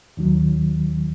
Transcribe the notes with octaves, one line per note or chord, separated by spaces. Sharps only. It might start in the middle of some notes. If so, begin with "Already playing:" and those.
D#2 D#3 F#3